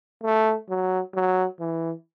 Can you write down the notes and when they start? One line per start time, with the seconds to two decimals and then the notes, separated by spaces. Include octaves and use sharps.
0.23 A3
0.69 F#3
1.15 F#3
1.59 E3